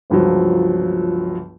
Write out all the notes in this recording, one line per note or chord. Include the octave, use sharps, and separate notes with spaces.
G1 C#2 F3 F#3